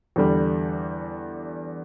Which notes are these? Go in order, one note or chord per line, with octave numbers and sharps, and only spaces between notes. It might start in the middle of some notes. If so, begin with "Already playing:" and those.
E2 D3 G3